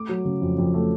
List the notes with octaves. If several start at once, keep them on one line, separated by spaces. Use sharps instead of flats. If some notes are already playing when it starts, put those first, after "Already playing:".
Already playing: A3 D6
F#3
C#3
F2
F2
A3